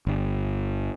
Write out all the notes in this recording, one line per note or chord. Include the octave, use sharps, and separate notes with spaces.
G1